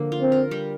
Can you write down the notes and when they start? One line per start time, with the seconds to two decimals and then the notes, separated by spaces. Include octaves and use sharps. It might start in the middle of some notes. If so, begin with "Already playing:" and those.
Already playing: D3 F3 A#3
0.12 F4
0.21 C4
0.32 A#4
0.51 G3